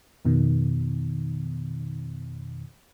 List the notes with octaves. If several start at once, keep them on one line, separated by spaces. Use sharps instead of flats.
F2 B2 D#3